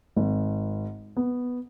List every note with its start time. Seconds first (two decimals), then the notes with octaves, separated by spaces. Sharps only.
0.16 G#1
1.17 B3